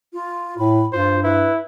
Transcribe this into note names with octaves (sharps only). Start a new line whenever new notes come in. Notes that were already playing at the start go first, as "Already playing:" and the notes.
F4
A2 B5
G2 F4 C5
E4 B4